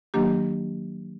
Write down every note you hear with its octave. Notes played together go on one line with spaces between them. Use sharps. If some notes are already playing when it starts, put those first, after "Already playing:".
D#3 F#3 A#3 D4 G4